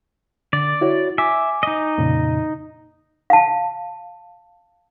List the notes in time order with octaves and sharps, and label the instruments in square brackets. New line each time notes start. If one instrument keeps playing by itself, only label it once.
[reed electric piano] D3 [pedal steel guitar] D5
[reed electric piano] E4 F#4 C#5
[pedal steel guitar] E5 [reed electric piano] G#5 D6
[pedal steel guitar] D#4 D#5
[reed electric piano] F2 A#2 C#3
[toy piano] F5 A5